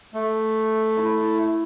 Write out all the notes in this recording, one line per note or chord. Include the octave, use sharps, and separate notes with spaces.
A3
E4